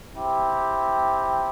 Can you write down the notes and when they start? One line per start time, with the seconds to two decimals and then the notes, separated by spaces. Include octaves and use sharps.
0.16 C4 E4 G4